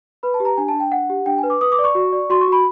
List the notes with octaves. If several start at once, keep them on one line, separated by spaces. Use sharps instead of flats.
B4 B5
A5
G4
A#5
D4 G#5
A5
D4
G5
D4 F#5
G4
D4 G5
B4 G#5
D6
B4 D#6
D6
D5
C#6
F#4
D5
F#4 C6
C#6
F#4 B5